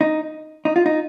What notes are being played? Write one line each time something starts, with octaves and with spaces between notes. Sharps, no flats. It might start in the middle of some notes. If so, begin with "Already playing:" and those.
D#4
D#4
F4
D#4